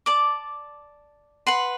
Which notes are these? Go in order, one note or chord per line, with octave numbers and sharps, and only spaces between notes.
D5 A5 D6
B4 F#5 C6